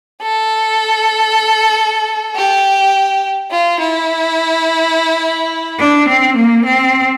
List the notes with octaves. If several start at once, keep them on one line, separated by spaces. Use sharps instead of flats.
A4
G4
F4
E4
D4
C4
A#3
C4